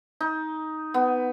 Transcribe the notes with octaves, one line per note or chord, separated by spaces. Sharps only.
D#4
B3